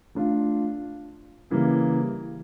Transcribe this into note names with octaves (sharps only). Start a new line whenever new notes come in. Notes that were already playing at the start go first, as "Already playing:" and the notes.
A3 D4 F4
C#3 E3 G3 A#3